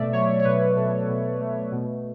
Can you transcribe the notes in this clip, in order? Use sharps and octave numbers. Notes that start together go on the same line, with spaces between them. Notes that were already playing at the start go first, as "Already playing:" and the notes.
Already playing: B2 A3 D5 E5
F#3 C#5
C#5
B2 B4
B2 A4
B2
A3
B2